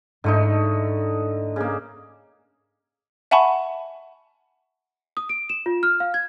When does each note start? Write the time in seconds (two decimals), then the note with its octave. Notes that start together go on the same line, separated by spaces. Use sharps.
0.24 G#2 D3 A3 D#4 E4
1.56 C#3 A#3
3.31 E5 F#5 G#5 A5 B5 C#6
5.17 D#6
5.29 D7
5.49 E7
5.66 F4
5.83 F6
6.00 F5
6.14 G#6